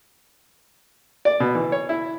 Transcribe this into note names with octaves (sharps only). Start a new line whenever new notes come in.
D5
B2
E3
C#5
E4